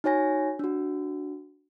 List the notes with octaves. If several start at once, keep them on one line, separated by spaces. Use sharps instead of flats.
D#4 F#4 C#5 G#5 A#6
D4 F#4